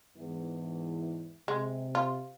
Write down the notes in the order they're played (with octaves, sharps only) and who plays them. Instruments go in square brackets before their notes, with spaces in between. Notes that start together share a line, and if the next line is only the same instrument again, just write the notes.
[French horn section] E2 G#2 E3
[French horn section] C3 [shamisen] G#3
[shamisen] F4